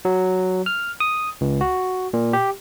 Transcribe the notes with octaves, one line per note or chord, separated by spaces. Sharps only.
F#3
F6
D#6
C#2
F#4
A#2
G4